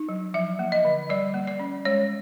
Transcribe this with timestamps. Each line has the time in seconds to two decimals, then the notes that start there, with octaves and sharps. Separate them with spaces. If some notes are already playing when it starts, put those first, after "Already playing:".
Already playing: D#4
0.09 F#3
0.34 F3 E5
0.59 A#3
0.72 D#5
0.85 D3
1.09 G3 D5
1.34 A#3
1.47 D5
1.59 C#4
1.85 G#3 C#5